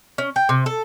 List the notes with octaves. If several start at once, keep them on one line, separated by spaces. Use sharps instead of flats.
C#4
G5
C3
A4